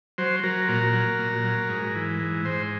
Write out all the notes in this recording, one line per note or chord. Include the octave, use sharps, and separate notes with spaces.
F#3 C5
F#3 A#4
A#2 A#4
F#3
A#2
F#3
G#2
E3
G#2
G#2 C5